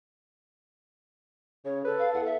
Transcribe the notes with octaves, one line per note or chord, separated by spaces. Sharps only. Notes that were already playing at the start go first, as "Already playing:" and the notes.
C#3 C#5
A4 B4
F5
E2 F#5
E5